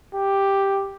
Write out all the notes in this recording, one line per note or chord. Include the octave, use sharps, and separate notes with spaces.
G4